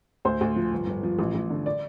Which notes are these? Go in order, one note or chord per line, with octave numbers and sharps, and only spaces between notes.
D2 C5
D2
F3
G1
G1
F3
A1
A1
D3
D5